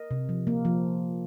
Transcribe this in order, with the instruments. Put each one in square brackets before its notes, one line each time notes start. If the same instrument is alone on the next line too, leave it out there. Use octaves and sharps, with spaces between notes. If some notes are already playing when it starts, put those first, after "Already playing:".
Already playing: [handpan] A#4 D#5
C3
F3
A#3
F3